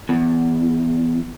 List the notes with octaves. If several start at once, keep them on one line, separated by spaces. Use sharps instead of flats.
E2